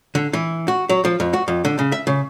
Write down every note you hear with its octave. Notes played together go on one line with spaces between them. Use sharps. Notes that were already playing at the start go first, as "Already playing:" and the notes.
D3
E3
F#4
F#3
F3
F2
F#4
F2
D3
C#3
E5
C#3